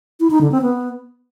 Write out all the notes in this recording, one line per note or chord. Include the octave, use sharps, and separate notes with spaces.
E4
D#4
D3
C4
B3